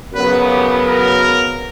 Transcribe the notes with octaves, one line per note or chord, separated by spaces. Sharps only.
F#2 C#3 F#3 B3 B4
G4
A#4